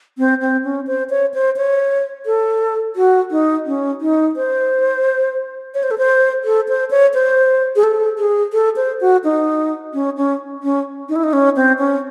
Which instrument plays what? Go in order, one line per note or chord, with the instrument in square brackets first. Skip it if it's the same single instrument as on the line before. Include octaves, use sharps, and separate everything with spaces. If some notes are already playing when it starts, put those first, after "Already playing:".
[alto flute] C4
C4
C#4
C5
C#5
C5
C#5
A4
F#4
D#4
C#4
D#4
C5
C#5
C5
A4
C5
A4
C5
C#5
C5
G#4
A4
G#4
A4
C5
F#4
D#4
C#4
C#4
C#4
D#4
E4
D#4
C#4
C4
C#4